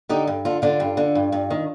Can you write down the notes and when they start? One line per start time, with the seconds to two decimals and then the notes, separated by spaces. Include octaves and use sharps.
0.09 D3 D#4 G4
0.27 G2
0.45 D3 F4 A4
0.62 D3 D4 F4
0.80 G2
0.97 D3
1.15 G2
1.32 G2
1.50 D#3